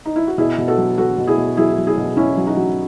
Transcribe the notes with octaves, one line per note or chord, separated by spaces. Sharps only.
D#4
E4
F#4
B2 E4 G#4
B2
F#4 A4
F#3
F#3 F#4 A4
B2
E4 G#4
B2
F#3 E4 G#4
F#3
E4 G#4
B2
B2 C#4 E4
F#3
D#4 F#4
F#3